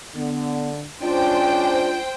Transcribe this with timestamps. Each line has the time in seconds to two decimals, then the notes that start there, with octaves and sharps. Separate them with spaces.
0.15 D3 B3
1.02 G#3 C#4 D4 F4 C5 G5